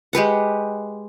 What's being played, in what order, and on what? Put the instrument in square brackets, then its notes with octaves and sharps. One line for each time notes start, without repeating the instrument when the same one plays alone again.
[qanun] G#3 G4 B4 F#5